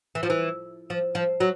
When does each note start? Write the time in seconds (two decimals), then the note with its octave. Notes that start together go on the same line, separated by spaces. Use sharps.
0.15 E3
0.23 F3
0.30 E3
0.90 F3
1.15 F3
1.40 F#3